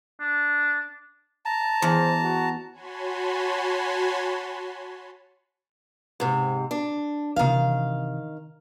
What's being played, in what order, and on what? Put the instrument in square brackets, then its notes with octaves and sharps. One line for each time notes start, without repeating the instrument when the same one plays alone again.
[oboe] D4
[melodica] A5 A#5
[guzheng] E2 [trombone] C5
[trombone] F#4
[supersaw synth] F#4 C#5 G#5 A5 B5 C6
[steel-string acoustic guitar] G#2 C3
D4
[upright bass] C3 E3 [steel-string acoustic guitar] D#3 F5